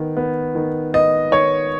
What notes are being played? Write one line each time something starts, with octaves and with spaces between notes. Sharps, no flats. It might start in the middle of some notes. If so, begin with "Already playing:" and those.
Already playing: D#3 B3
B3
D#3
B3 D#5
D#3 C#5